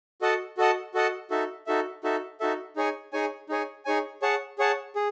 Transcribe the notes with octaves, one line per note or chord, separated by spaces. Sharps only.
F#4 A4 D#5 F#5 A5
F#4 A4 D#5 F#5 A5
F#4 A4 D#5 F#5 A5
D#4 F#4 A4 E5
D#4 F#4 A4 E5
D#4 F#4 A4 E5
D#4 F#4 A4 E5
D#4 G#4 C#5 G#5
D#4 G#4 C#5 G#5
D#4 G#4 C#5 G#5
D#4 G#4 C#5 G#5
G#4 C#5 F#5 A5
G#4 C#5 F#5 A5
G#4